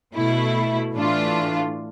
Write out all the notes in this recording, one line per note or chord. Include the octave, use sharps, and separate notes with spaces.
B2 A3 E4
A2 E3 A3 D4 F4